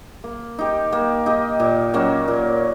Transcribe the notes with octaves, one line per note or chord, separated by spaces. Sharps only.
A#3
D#4 G4
A#3
D#4 G4
A#2
F#3 A#3 C#4
A#2